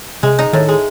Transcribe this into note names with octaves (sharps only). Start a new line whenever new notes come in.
C3 G#3
D#4
A2 D#3
G#3